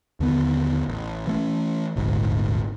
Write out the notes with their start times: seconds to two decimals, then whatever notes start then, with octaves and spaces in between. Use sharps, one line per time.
0.20 D#2 D3 B3
0.88 A1
1.27 E3 A3 C#4
1.96 D#1 G#1 D2 G#2